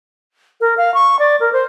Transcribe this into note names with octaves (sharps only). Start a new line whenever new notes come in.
A#4
F5
C#6
D5
A#4
C5